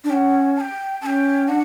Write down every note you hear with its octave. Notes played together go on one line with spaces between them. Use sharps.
D4
C#4 F#5 G5
A5
G5
C#4 G5 A5
D4 F#5